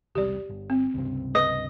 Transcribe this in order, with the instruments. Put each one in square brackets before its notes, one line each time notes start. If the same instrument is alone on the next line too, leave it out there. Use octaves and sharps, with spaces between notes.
[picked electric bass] E1 C2 G3 [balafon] G4 D5
[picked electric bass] G1
[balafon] C4
[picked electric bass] C#2 G2 C3
[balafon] B4 [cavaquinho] D#5